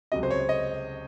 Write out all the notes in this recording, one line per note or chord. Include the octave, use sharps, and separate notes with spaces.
C#2 C3 F#3 D#5
C5
C#5
D#5